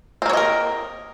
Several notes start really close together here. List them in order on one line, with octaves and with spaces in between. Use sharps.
C4 A#3 C#5 D#5 A#4